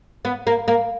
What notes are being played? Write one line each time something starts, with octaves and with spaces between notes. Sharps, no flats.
B3
A#3
A#3